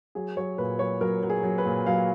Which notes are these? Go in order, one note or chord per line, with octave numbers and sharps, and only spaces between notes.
F#3 G#4
F#3 C#5
A#2 B4
F#3 C#5
F#3 A#4
F#3
G#4
F#3
B4
A#2
F#3 F5